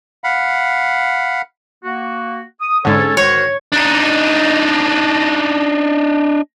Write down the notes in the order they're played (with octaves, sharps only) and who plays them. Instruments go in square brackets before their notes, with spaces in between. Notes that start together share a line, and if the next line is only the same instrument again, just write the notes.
[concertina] F5 F#5 B5
[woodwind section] A#3 F#4
D#6
[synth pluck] G#2 D3 [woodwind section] C#4 A4 C#5
[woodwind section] D#3 F#4 C5 [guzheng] C#5
[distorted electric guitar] D4 D#4